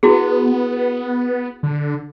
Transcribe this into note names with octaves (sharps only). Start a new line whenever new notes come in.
B3 E4 F#4 G#4
D3